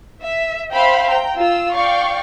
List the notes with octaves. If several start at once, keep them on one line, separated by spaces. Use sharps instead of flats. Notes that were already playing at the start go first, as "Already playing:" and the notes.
E5
C5 E5 F5 G5 B5 C6
G5 A#5
F4 E6
D5 F5 G5 C#6